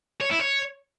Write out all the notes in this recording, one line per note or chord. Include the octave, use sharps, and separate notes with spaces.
C#5
E4
C#5